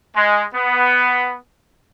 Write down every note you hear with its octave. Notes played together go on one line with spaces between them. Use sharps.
G#3
B3